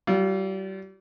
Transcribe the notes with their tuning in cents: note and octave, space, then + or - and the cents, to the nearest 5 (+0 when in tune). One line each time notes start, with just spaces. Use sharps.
G3 -35 F4 +0